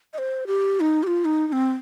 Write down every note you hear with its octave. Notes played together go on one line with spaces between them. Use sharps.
D#5
C5
G4
D#4
G4
F4
D#4
D#4
C4